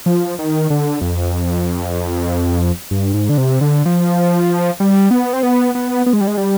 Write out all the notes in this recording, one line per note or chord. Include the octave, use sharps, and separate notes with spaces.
F3
D#3
D3
F2
G2
G#2
D3
C3
D3
F3
G3
B3
C4
B3
B3
B3
G#3
G3
G#3
G3